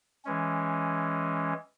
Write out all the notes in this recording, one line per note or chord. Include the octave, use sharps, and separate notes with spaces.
E3 G#3 C#4